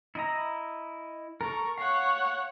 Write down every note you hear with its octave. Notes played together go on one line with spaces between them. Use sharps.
E4 D#5 A#5
A4 A#4 A#5 C#6
C#5 F5 F#5